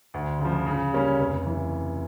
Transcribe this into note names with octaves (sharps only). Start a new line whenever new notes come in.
D2
C#3
F3
C#3
G3 A#3 C#4
F1
E3